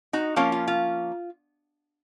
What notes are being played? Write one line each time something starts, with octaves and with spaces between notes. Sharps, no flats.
D#4 F#4
F3 A#3 C#4 F4
F4
F4